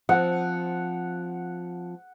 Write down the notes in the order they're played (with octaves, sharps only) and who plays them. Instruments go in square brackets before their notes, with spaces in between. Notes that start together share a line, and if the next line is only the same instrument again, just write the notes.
[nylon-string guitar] F3 C4 [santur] F#5